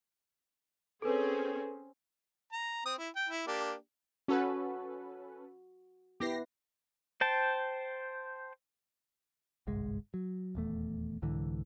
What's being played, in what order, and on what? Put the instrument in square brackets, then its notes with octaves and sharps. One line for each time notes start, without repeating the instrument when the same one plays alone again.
[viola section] C4 C#4 G#4 [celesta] A4 B4
[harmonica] A#5
C4 D#6
E4
G5
E4
A#3 D4 G4
[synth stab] C#4 A4 B4 [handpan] F#4
[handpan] B3 E4 B4 [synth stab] G4 A#6 C7
[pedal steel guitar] C5 G5 A5
[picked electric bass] G1 C2 G#2 G#3
F#3
D#1 E2 A3
C2 G#2 D3 E3